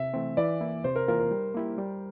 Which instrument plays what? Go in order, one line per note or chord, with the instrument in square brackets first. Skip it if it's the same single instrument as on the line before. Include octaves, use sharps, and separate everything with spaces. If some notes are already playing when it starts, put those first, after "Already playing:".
Already playing: [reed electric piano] C3 [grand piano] E5
[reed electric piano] E3 A3 C4
[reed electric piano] E3 [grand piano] D5
[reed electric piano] A#3 E4
[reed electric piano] C3 [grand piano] C5
[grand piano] A#4
[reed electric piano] E3 A#3 F4 [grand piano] A#4
[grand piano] A#4
[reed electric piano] G3
A#3 E4 G4
G3